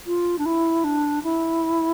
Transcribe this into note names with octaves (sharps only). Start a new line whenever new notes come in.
F4
D4
E4
D4
E4